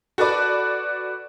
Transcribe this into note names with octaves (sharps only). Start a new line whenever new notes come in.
F#4 A4 B4 D5